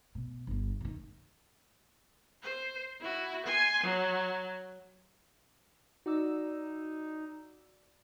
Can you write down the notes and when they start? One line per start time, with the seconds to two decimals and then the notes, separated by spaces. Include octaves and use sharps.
0.15 B2
0.47 G1 D3
0.81 D3 D#3
2.43 C5
3.01 E4 F#4
3.46 G#5 C6
3.84 F#3
6.06 D#4 F#4 D5 E6